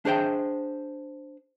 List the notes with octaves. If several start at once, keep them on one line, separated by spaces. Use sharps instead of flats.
D4 G#4 C5 G5